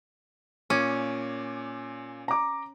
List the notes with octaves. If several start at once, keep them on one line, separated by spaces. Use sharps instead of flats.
A#2 C#4 G#5 D6
A#5 D6